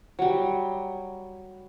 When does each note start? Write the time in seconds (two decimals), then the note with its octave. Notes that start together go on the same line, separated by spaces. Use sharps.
0.19 F#3 G3